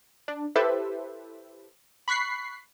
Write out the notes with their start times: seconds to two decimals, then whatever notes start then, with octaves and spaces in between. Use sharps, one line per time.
0.28 D4
0.56 E4 G4 A4 B4 C5 E5
2.08 B5 C#6 F#6 B6 C7